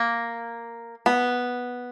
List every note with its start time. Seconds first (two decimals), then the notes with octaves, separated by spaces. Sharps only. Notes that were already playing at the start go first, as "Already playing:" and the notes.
Already playing: A#3
1.06 B3